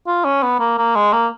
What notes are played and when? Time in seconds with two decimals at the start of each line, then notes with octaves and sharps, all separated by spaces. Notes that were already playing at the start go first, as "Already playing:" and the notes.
0.07 F4
0.25 C#4
0.43 B3
0.59 A#3
0.78 A#3
0.95 G#3
1.13 A#3